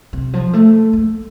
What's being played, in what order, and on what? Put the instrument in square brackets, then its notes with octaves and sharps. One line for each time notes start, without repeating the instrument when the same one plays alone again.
[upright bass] C3
F3
A3
A#3